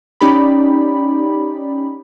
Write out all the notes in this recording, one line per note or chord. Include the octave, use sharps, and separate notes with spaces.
C#4 D#4 G4 D5 B5